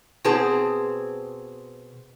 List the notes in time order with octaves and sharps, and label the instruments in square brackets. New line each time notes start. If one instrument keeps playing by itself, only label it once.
[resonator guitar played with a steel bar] B2 C4 G#4 C5 A5